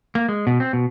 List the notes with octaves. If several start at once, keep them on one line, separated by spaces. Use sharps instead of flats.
A#3
G#3
B2
C4
B2